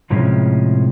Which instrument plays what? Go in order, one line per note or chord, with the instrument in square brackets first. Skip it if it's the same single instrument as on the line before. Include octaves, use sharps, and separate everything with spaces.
[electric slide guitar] F2 A2 C3 F3 G#3 C#4